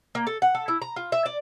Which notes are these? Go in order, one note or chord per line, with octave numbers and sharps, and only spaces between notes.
A#3
A4
F#5
A4
E4
A#5
F4
E5
D5